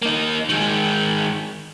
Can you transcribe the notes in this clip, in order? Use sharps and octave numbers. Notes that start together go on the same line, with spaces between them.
A#3 D#4
D#3 G#3